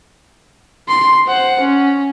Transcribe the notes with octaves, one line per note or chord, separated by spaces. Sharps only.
C6
C5 F#5
C#4